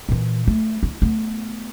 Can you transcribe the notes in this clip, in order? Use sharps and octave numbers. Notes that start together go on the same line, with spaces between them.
A#2 E3
A3
E4
A3 B3